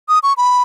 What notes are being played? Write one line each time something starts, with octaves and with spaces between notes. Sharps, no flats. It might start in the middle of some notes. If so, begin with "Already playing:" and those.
D#6
C#6
B5